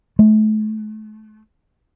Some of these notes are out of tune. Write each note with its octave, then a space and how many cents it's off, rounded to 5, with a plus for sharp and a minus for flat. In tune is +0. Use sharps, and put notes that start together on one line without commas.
A3 -35